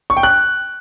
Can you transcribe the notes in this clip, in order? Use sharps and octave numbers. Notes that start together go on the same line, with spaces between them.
C#6
G5
F#6